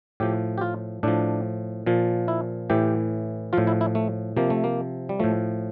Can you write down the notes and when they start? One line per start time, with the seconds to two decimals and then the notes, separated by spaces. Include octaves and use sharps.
0.20 A2 F3 G4
0.58 G4
0.61 F4
1.03 A2 F3 D4
1.86 A#2 F3
2.28 E4
2.70 A2 E3 G4
3.53 A2 F3 F4
3.67 E4
3.81 E4
3.95 A3
4.37 C3 F3 A#3
4.50 A3
4.64 A#3
5.09 G3
5.20 A2 F3 A3